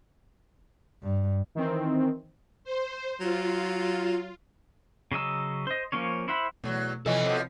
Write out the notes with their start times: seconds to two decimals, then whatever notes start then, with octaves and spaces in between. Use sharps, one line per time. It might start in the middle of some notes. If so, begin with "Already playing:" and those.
1.02 G2
1.55 D#3 E3 C4
2.64 C5
3.21 F#3 F4
5.12 C#3 F#3 D#5 E6
5.67 C5 D#5
5.92 F3 A#3 C#4 C#5
6.28 E4 C5 E5 F#5 B5
6.64 E2 B2 F#3 A3
7.06 C3 E3 F3 C#4 A4 D#5
7.26 B2 F3 C4